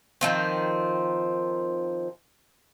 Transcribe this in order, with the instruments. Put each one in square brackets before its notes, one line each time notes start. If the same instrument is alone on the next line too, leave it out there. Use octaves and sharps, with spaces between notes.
[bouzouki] D#3 F3 C4